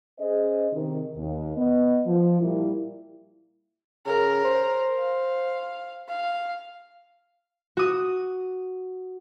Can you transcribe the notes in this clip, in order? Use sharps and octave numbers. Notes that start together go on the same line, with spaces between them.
C#4 G#4 C5 D#5
C3 D#3
D#2
B3 D#5
F3
A#2 G3 A#3 E4
C#3 A#4
C5
F5
F5
F#4 D#6